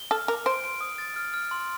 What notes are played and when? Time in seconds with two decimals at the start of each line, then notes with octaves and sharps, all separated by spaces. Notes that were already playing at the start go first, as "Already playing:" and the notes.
Already playing: G7
0.11 A4 F6
0.28 A#4 D6
0.46 C5 D7
0.64 D7
0.81 D#6
0.98 A6
1.16 F6
1.34 F6
1.51 C6